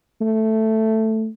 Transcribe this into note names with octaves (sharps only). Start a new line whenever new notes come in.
A3